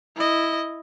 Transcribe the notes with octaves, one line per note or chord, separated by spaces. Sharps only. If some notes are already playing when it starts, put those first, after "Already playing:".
E4 D#5